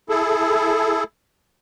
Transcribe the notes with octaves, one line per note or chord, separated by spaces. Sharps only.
E4 G#4 A4